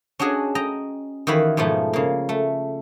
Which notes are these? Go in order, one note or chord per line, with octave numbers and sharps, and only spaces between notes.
C#4 D4 F#4 G#4 D#5
D#5 G5 A#5
D#3 E3 F#4 F5 B5
G#2 B2 F3 A3
C#3 A#3
A3